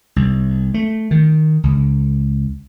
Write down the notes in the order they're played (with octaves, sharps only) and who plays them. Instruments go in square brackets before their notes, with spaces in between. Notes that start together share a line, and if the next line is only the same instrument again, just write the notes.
[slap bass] C2
A3
D#3
C#2